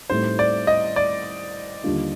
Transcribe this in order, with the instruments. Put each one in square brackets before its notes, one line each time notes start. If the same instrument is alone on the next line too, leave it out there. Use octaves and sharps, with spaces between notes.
[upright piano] A2 G3 C4 D#4 [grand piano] C5
[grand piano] D5
D#5
D5
[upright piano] D#2 D3 G3 D4 F4